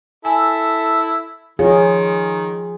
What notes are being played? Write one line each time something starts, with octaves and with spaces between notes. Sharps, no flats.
E4 A4 G#5
D#3 F3 F4 G#4 C#5